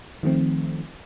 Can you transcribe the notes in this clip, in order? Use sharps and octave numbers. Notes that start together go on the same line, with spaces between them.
D#3 F3 A3 C4